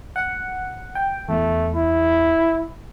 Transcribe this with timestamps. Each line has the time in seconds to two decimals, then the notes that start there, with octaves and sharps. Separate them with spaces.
0.16 F#5
0.95 G5
1.29 E2 A3
1.74 E4